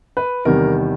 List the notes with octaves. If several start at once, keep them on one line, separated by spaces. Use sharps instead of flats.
B4
E2 C3 D#3 G3 A#4